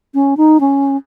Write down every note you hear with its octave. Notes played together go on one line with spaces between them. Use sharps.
C#4
D#4
C#4